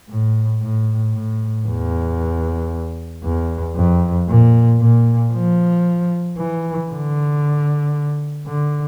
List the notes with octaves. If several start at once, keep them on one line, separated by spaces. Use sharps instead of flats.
A2
A2
A2
E2
E2
F2
A#2
A#2
F3
E3
D3
D3